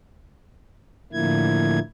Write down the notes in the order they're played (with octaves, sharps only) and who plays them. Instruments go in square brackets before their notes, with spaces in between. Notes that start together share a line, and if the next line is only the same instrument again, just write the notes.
[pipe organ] A2 D3 F3 A#3 E4 G#6